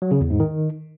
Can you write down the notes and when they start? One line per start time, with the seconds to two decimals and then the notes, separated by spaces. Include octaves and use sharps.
0.02 F#3
0.11 C#3
0.21 E2
0.30 G#2
0.40 D#3